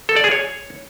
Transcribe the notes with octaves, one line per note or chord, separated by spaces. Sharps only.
A4
D5
G#4
C#5